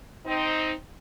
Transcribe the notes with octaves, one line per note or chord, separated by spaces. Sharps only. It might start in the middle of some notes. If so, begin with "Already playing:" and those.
C4 D#4